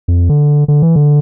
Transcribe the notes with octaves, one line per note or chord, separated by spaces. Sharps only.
F2
D3
D3
E3
D3